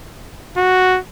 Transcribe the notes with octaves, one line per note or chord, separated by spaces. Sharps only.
F#4